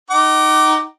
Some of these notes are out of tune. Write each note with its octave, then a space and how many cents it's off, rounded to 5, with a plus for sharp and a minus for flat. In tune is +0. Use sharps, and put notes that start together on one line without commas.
D#4 +0 F#5 +45 D6 +0